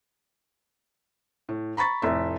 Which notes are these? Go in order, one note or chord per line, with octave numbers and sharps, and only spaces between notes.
A2
A#5 B5 C#6 A6 B6
F1 A2 E5